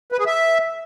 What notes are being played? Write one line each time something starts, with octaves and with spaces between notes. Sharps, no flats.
B4
G#4
E5